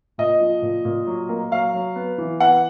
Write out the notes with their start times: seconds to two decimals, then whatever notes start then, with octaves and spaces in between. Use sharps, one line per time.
0.18 A#2 D#5
0.40 F3
0.62 A#2
0.85 A#2
1.07 F#3
1.29 A#3
1.51 F#3 F5
1.74 F#3
1.96 B3
2.18 E3
2.40 B3 F#5